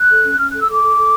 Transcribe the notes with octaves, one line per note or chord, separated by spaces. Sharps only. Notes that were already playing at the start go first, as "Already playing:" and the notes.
Already playing: F#6
A4
C#4
C#4 F6
A4 F#6
E6
A4 D6
A4
A4